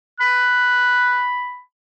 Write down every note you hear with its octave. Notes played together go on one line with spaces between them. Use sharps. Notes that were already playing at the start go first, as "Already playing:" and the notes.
B5 F#6